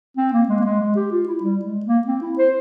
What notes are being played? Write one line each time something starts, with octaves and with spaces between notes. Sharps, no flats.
C4
A#3
G#3
A#3
G#3
G#3
G4
F4
E4
G3
G#3
A#3
C4
E4
C5